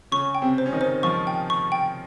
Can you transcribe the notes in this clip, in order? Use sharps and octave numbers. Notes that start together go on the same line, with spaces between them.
C#3 C#4 C#6
G5
C3 C4
C5
C#4
D#3 D#4
C5
F3 F4 C#6
G5
C#6
G5